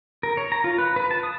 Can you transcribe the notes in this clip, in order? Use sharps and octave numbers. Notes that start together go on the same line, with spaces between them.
A#4
C#5
A#5
F4
B4
B4
A5
D#6